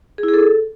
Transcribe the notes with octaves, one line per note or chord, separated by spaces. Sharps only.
G#4
E4
G#4
A4